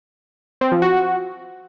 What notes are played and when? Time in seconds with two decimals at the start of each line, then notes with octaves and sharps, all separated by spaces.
0.61 C4
0.72 F3
0.82 F#4